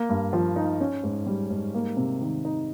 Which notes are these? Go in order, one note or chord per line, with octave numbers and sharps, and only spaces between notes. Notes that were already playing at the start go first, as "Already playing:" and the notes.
Already playing: A#3
G2
F3
D#4
C#4
G#2
G3
G#2
A#3
C3
D#3
D#4